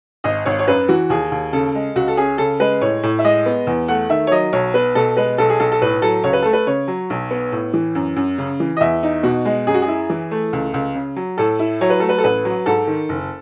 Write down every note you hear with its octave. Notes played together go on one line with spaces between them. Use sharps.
G#1 D#5
G#1 C#5
C#5
F#2 B4
E3 F#4
D#2 G#4
D#2
C#3 A4
G#3
C#2 F#4
A4
C#4 G#4
C#3 A4
G#3 B4
A2 C#5
A2
E5
G#3 D#5
B3
E2
A3 F#5
D#3 E5
C#5
F#3 D#5
B1 C#5
B3 B4
B2 A4
G#3 B4
B1 A4
G#4
B1 A4
A4
A2 B4
F#3 A4
C#2 C#5
B4
A3 A4
B4
C#3 C#5
F#3
B1
B3
A2
E3
F#2
F#2
C#3
E3
D#5
E2 E5
D#4
B2 F#4
G#3
F#2 G#4
F#4
G#4
E4
E3
A3
C#2
C#2
C#3
F#3
A2 A4
E4
F#3 C#5
B4
A3 A4
B4
A4
A1 B4
F#3
G#2 A4
D#3
F#1